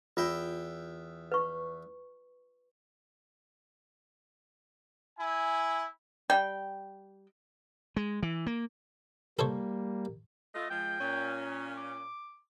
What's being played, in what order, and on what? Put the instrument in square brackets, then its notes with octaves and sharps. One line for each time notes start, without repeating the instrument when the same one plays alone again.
[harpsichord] E2 E5 G5 [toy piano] F4
[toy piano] B4 C#6
[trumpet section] E4 G#5
[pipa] G3 G5
[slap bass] G#3
E3
A#3
[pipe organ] G3 A#3 [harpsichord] A4 C5 C#5
[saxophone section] A3 F4 [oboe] D#5
[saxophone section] F3 G#3 [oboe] G5
[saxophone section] A#2 C#4
[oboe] D6